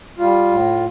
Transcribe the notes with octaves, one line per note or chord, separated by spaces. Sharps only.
G3 F4
A2